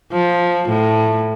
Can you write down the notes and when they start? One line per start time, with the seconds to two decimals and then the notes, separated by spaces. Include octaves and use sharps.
0.13 F3
0.69 A2